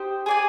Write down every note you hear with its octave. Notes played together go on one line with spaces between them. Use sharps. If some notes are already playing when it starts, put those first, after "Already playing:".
Already playing: D#4 G4 C5
G#4 D5 G#5